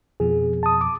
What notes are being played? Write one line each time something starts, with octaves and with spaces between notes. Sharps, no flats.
F2 B2 F3 G#4
A5 D#6
D6